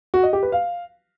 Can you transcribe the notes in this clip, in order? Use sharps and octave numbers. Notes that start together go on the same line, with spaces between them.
F#4
D#5
G4
B4
F5